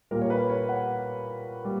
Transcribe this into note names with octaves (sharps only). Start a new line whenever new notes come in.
A#2 G3 A#3 A#4
C#5
B4
C#5
F#5
G3 A#3